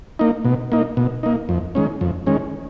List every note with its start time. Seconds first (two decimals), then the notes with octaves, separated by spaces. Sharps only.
0.19 A#3 D#4
0.45 B2
0.72 A#3 D#4
0.97 B2
1.23 A#3 D#4
1.49 F2
1.75 D#3 G#3 C#4
2.01 F2
2.27 D#3 G#3 C#4